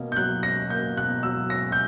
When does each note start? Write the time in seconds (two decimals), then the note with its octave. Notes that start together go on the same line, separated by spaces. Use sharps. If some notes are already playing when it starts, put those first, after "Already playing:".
Already playing: B2 A#3 C#4
0.12 G6
0.17 F#3 F#6
0.43 C#4 A#6
0.70 A#3 G6
0.97 B2 F#6
1.23 F#3 E6
1.50 C#4 A#6
1.72 G6